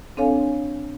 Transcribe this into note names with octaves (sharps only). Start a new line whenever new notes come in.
C4 D4 A4 C#5 F5 G#5